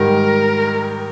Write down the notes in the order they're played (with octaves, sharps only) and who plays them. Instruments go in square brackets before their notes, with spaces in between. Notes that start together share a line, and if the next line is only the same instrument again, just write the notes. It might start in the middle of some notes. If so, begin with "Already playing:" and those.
Already playing: [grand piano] G#2 D#3 G3 [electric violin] A#4